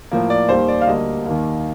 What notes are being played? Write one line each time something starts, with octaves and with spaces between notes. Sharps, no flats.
A2 F3 A#3
D5
D#2 D#3 G3 A#3 C5
D5
F5
D2 D3 G3 A#3 D#5
D#2 D#3 A#3